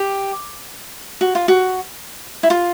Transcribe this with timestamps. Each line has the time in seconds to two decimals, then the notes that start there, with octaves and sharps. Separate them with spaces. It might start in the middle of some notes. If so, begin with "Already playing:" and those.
Already playing: G4
1.21 F#4
1.35 F4
1.48 F#4
2.43 E4
2.50 F4